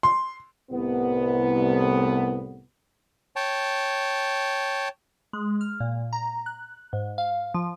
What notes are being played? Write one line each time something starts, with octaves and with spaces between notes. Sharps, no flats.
C6
C2 A2 B3
C#5 G5 A5
G#3
F6
A#2
A#5
F#6
G#2
F5
F3